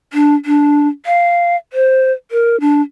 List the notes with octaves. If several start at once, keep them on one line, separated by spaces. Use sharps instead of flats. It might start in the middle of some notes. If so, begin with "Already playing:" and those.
D4
D4
F5
C5
A#4
D4